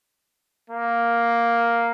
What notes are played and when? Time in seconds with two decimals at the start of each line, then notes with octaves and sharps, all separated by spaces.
0.70 A#3